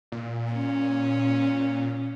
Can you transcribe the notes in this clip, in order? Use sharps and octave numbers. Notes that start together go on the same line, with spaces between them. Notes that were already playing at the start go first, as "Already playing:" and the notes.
A#2
C#4